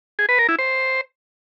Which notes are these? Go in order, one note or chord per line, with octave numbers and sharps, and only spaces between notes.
G#4
B4
A#4
E4
C5